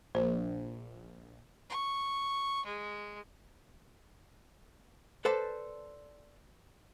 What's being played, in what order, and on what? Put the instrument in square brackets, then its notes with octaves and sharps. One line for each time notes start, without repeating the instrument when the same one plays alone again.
[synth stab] A#1 [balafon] C5
[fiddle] C#6
G#3
[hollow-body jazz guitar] A4 B4 C5 D5 A5